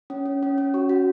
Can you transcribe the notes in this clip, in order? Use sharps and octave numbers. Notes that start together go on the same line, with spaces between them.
C#4
C#4
C#4
C#4
F#4 C#6
F#4